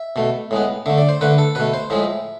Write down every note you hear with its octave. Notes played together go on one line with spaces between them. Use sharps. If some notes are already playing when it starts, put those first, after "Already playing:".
Already playing: E5
B2 A3
A2 G#3 B3
D3 A3 E5
D5
C5
D3 A3 B4
A4
B2 A3 B4
C5
A2 F3 G#3 E5